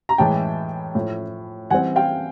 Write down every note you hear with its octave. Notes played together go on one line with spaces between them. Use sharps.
A#5
A2 E3 G#3 G5 A5
A2 F3 A3
E3 G3 C4 F#5 G#5
F5 G5